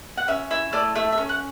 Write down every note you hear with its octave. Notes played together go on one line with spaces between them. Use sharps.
F#5
C#4 E5
E4 E5
A3 D5
A3 E5
E5
C#4
F#5